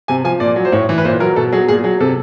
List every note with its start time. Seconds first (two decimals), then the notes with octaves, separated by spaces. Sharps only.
0.08 C3 G#5
0.24 F3 G#5
0.40 A#2 D5
0.56 F#3
0.65 C5
0.72 A2 C#5
0.89 E3
0.98 B4
1.05 A#2 C5
1.20 F#3 A#4
1.36 B2 A4
1.52 F#3 G#4
1.68 A#2 G#4
1.84 F#3 G#4
2.00 C3 A4